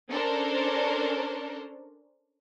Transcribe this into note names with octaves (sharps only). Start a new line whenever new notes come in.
C#4 D4 A4 A#4 C5